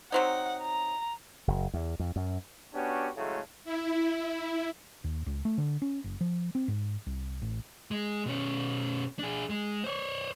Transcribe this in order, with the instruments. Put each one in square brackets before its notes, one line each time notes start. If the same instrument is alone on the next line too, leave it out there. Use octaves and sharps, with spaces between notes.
[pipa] F#3 C4 D#4 [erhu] F#5
[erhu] A#5
[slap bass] F#1
E2
F2
F#2
[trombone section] B3 C#4 D4 F#4 G4
A2 C#3 F#3 G#3 A3
[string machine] E4
[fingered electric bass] D#2
C#2
A3
D3
C#4
F#1
F3
C4
G#2
C2
A1
[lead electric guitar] G#3
B2 C#4
D4 G#4
G#3
C5 C#5